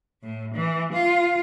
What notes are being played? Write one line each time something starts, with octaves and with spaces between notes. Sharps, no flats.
A2
E3
F4